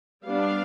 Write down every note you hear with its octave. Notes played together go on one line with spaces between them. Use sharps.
G3 B3 D4 F5